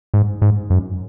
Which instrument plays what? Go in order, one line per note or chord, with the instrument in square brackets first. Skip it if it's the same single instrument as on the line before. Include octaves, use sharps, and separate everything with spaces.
[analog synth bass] G#2
G#2
F#2